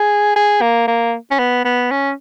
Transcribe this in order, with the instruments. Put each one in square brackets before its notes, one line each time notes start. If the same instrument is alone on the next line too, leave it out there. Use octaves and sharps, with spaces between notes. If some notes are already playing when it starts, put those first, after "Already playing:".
Already playing: [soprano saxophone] G#4
G#4
A#3
A#3
C#4
B3
B3
C#4